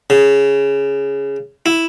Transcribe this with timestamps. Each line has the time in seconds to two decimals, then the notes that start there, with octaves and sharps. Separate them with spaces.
0.10 C#3
1.66 E4